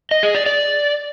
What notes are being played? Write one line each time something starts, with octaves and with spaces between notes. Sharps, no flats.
D#5
G#4
D5
D5